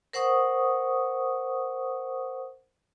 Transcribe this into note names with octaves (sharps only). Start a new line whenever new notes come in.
A#4 C5 F#5 C#6 D#6